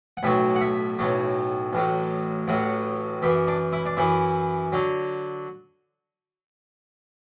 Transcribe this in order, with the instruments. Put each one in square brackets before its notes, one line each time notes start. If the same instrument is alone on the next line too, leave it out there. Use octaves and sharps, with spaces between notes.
[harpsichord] F#5
B1 A2 F#3 E5
F#5
E5
B1 A2 F#3
A1 A2 F#3
A1 A2 F#3 F#5
F#2 E3 E5
D4
E4
D4
F#2 E3 E4
D3 F#3